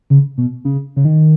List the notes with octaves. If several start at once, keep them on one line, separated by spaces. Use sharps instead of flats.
C#3
B2
C#3
C#3
D#3